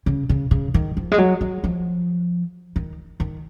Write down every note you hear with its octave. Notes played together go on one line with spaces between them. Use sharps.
C#3
C#3
C#3
D#3
F3
G#3
F#3
F#3
F3
D#3
D#3